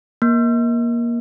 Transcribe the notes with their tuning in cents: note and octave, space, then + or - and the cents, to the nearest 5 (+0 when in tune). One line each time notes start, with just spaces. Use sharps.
A#3 +20